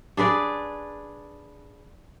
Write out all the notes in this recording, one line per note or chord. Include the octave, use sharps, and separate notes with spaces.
D4 G#4 B4 D5